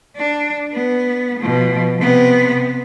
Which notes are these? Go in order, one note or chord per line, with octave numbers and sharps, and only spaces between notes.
D4
B3
B2 F3
C3 B3